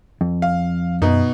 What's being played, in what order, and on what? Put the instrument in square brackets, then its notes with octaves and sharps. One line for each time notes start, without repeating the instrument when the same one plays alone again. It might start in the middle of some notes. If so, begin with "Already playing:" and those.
[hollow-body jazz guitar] F2
[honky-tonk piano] F5
[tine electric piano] F#2 [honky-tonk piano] B2 D#4